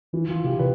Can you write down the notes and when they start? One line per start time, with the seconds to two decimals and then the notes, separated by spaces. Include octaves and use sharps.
0.13 E3 E4
0.28 E3 F4
0.44 C3 G4
0.59 C3 B4